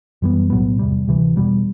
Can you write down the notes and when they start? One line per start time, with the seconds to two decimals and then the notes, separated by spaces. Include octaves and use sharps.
0.22 F#2 E3 G3 B3
0.50 B1 A2 F#3 B3
0.79 E2 C3 G3
1.08 D2 C3 E3
1.36 E1 E2 B2 G3